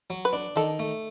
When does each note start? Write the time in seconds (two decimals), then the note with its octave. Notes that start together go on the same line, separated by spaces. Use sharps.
0.10 F#3
0.25 B4
0.33 D4
0.56 D#3 A4
0.79 A3